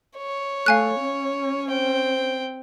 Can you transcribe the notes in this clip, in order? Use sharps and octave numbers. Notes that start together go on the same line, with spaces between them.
C#5
A3 F5 G#5 F#6
C#4
C4 G5